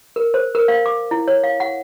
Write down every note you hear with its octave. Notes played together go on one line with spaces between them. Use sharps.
A#4
C5
A#4
F5
D6
E4
C#5
F5
F#5